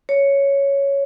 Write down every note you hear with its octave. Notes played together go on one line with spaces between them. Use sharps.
C#5